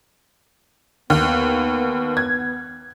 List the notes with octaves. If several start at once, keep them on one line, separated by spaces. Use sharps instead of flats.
D#2 B3
G#6